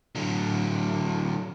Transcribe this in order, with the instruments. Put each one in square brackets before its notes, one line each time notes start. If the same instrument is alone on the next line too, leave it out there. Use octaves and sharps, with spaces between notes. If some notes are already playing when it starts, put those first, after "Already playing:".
[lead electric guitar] D3 F#3